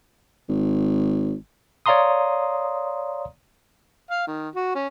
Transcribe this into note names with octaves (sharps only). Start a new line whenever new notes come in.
G#1
C#5 D5 F5 A#5 C6 D#6
F5
D#3
F#4
C#4